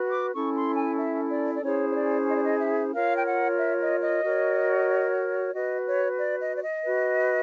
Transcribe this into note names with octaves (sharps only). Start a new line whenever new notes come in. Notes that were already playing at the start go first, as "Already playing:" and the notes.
Already playing: F#4 B4
D6
C#4 E4 A4 C#6
C6
G#5
E5
D5
D5
C#4 E4 G#4 C5 C#5
C#5
D5
D#5
D5
D#5
E5
F4 A#4 C#5 F5
G5
F#5
E5
D#5
D#5
F#4 A#4 C#5
F#4 B4 D#5
C#5
D5
D#5
D5
D#5
F#4 B4